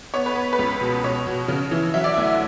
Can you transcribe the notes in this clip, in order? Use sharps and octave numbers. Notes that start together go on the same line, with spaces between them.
B3 C#5
B4
B3
B4
C#2
B2
B2 C#5
B2
C#3
E3
F#3 E5
D5
D2 E5